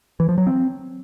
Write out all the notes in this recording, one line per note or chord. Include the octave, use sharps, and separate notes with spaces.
E3
F3
F#3
C4